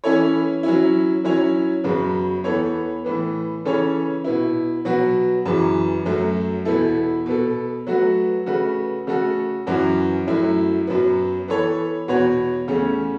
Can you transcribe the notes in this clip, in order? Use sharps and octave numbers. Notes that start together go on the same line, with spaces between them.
E3 C#4 E4 A4 C#5
F#3 C#4 E4
F#3 C#4 E4 C#5
F#2 C#3 F#3 B3
E2 E3 B3 A4 C#5
A2 E3 B3
C#3 E3 C#4 A4 C#5
B2 B3 E4
B2 F#3 B3 F#4 B4
F#2 C#3 E3
F#2 F#3 A3
E2 B2 B3 E4 A4
B2 B3 A4
F#3 A3 F#4 B4
C#3 A3 F#4 B4
C#3 A3 F#4 A4
F#2 E3 C#4 F#4
F#2 F#3 A3 E4
F#2 F#3 B3
E3 B3 A4 C#5
E2 B2 B3 F#4 C#5
E2 C#3 A3 C#4